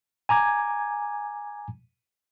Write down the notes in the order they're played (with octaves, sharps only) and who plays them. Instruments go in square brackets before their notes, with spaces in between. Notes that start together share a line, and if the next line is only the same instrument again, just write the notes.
[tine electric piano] G#5 A#5 D6 G#6